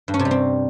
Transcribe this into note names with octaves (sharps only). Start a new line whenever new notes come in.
G2
C#4
C3
G3
C4